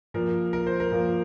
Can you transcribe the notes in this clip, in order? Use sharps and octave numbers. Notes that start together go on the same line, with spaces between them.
A#2 F3 A#3 A#4
A#4
C5
A#4
A#2 F3 A#3